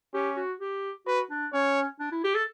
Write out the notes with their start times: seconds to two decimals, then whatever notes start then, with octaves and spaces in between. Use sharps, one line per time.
0.14 C#4 G4
0.36 F#4
0.60 G4
1.06 F#4 B4
1.30 D4
1.53 C#4 C#5
2.00 D4
2.12 E4
2.24 G4
2.35 A4